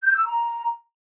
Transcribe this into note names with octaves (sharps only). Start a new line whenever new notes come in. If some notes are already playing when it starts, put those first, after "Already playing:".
G6
E6
A#5